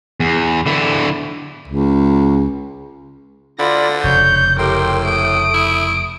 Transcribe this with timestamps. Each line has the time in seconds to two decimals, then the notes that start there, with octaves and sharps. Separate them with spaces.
0.20 E2
0.66 D3 E4
1.68 C#2
3.59 D3 F4 D5 B5 A#6
4.04 F1 C#3 C#5 G6
4.59 A2 G4 A#4 G5 C6
5.05 A3 D#6 D7
5.54 E4